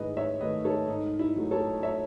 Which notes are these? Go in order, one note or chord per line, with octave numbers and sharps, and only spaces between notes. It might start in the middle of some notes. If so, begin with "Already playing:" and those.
Already playing: G#2 D#3 A3 E4 G#4 B4 D#5
C#5 E5
D#3 A3 B4 D#5
A4 C#5
G#2 D#4
E4
F#3 A3
A4 C#5
C#5 E5